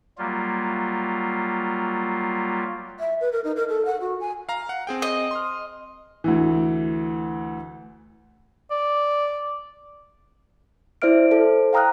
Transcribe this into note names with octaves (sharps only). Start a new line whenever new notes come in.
F#3 G3 A#3 F4
E5
B4
A#4
D#4
A#4
A4
F#5
F#4
G#5
F5 A#5
F#5
C4 G#4 G5
D#5
C6 F6
D2 E3
D5
E4 C5 D5 E5 F6 D7
A4 C5
F5 G5 A#5 D#6 F6 F#6